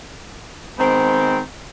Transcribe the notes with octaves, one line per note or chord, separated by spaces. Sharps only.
D#3 G#3 B3 C4